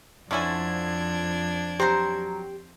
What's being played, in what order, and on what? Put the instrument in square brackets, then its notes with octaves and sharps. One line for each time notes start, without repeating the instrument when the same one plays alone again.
[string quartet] F2 D4 G#6 [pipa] D3 C#4 E4 [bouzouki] F3 G#5
[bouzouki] F#3 A#5 [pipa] C4 C5 [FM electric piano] G4